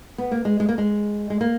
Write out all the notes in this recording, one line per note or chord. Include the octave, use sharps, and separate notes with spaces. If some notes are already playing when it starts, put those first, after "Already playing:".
B3
A#3
G#3
G#3
A#3
G#3
G#3
A#3